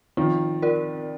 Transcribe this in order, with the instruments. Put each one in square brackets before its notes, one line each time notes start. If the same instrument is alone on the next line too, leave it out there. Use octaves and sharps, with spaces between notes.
[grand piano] D#3 F3 [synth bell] C4
[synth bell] F4 A#4 D5